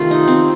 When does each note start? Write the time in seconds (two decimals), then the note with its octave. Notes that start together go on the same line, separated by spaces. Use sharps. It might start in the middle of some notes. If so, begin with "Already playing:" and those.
Already playing: C3 D#3 A3 F4
0.11 D#4
0.28 C4